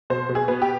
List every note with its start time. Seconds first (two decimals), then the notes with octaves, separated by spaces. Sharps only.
0.10 B2 C5
0.29 B2
0.35 G#4
0.48 B3
0.62 G4